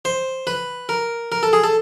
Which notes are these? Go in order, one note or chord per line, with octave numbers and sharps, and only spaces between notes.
C5
B4
A#4
A#4
A4
G#4
A4